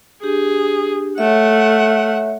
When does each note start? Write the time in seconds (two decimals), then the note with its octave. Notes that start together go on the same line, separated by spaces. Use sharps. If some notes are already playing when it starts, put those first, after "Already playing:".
0.23 D4 G4 G#4
1.18 A3 C#5 E5 F#5